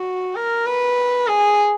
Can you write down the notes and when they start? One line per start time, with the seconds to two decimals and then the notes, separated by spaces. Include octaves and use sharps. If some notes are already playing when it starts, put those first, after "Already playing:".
Already playing: F#4
0.35 A#4
0.66 B4
1.27 G#4